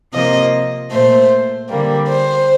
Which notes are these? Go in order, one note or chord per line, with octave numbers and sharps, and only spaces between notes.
C3 F3 A#3 D#5
A#2 A3 C5
D3 G3 A#3
C5